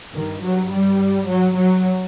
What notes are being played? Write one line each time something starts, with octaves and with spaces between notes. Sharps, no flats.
G2 D#3
F#3
G3
F#3
F#3